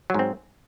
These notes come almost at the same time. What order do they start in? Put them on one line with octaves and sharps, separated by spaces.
F#3 G#2 C4